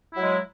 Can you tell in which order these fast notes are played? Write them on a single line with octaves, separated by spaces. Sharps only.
E4 F#3 G#3